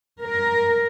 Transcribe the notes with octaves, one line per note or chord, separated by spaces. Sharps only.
A#4